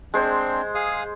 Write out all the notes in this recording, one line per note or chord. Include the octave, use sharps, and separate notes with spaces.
G#3 C4 D4 C5
G#4 F5 D#6